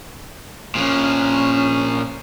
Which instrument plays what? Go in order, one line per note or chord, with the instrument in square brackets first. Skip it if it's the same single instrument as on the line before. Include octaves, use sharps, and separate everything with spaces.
[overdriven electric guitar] A#2 F3 [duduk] C#4